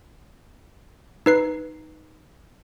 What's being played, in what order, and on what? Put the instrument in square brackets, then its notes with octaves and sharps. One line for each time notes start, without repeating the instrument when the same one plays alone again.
[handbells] D#4 B4 C7